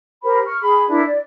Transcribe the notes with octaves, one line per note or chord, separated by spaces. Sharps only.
G4 A#4 C5 B5
C#6 F6
G#4 B5
D4 E4 A#4
D5